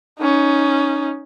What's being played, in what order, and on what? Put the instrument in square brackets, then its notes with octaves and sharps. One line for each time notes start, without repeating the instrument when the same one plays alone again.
[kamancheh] C#4 D#4